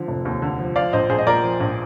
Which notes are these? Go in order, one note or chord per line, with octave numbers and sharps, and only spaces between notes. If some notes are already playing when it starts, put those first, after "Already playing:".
Already playing: D3 F3
F1
D#2
D3
F3
F3 D5 F5
A#1 C5 D#5
A#1 G#4 C5
D#5
A#2 A#4 D5
F3
A#1